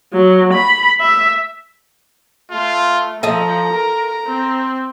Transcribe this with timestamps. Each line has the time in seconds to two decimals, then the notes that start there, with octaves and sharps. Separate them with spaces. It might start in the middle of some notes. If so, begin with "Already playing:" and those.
0.13 F#3
0.53 B5
1.01 E5
2.51 A3 F4
3.23 F3 A4 D#5 E5 A#5
3.73 A#4
4.26 C4